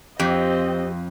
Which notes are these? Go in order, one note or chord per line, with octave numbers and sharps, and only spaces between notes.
F2 C4 G4 D#5